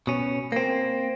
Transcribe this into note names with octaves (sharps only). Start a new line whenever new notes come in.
B2 C#4
A#3 C4